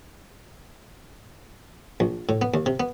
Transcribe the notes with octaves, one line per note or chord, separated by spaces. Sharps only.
A#1
A2
B3
D#2
C3
B3